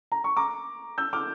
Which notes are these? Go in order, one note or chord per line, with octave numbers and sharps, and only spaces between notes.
A#5
C#6
A#5 D6
E6 G6
D6 F6